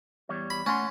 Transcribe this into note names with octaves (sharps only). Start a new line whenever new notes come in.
E2 G3 C#5
B5
A3 C#4 F#5 C6